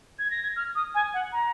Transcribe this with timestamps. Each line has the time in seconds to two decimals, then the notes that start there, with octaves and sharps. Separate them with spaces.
0.19 G#6
0.31 A#6
0.43 G#6
0.56 F6
0.76 D#6
0.95 G#5
1.14 F#5
1.33 A#5